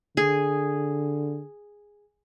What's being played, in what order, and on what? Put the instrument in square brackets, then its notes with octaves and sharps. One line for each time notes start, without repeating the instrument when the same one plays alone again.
[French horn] D3 [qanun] G#4